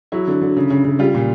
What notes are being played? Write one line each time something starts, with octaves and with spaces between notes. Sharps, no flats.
F#3 E4
D3
D3
C#3
C#3
C#3
G3 F4
A#2